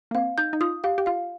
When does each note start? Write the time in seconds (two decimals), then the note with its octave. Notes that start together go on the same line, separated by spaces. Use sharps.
0.11 A#3
0.15 C4 F5
0.38 D#4 G6
0.53 D#4
0.61 F4 D#6
0.84 G4 F5
0.98 G4
1.06 F4 F5